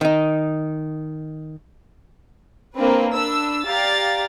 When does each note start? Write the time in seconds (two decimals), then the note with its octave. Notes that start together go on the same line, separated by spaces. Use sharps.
0.01 D#3 D#4
2.76 A#3 C4 D4 B4
3.13 D4 B5 E6
3.66 G4 D5 F5 A#5 A6